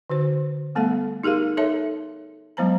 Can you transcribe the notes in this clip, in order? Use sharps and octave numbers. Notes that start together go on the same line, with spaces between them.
D3 F#4 C5
G3 A3 B3 A4 F5 F#5
D#4 G4 G#4 A#4 F5
D#4 A4 C#5 E5 A5
F#3 G#3 B3 C5 A5 A#5